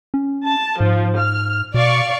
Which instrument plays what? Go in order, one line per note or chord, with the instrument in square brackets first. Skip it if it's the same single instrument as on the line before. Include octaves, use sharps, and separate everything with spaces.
[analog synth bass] C#4
[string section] A5
[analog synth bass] G#2 [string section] F3
[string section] F6
[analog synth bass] B2 [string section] D5 F5 C#6